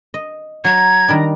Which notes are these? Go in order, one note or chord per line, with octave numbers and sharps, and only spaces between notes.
D#5
F#3 A#5 G#6
D#3 G3 D4 A#5